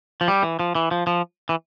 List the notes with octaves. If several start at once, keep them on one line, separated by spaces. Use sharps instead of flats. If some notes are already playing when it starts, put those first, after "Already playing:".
F3
G3
E3
F3
E3
F3
F3
E3